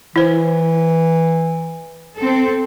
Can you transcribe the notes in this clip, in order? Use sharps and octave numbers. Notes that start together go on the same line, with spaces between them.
E3 E4 C5
C4 A4